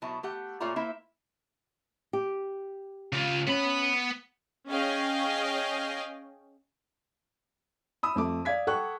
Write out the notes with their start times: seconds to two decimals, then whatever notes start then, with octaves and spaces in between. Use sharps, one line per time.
0.02 B2 F#3 E4 A5
0.23 A3 G4 F#5
0.60 A#2 A3 F4 C#5 D5 A#5
0.76 A#3 E4 C5 E5
2.13 G4
3.13 C#3 F4
3.47 B3 C#4 B5
4.70 C#4 G#4 D#5 F5 G5
8.03 B5 D#6 E6
8.16 F2 A3 D6
8.45 D5 F5 G#6 B6
8.67 A4 F#5 G5 C#6 F#6